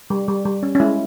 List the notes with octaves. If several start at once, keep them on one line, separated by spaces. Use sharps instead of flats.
G3
G3
G3
C#4
C#4
G#3 E4